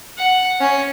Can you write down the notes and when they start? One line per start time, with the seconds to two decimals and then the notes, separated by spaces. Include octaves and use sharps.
0.17 F#5
0.60 C#4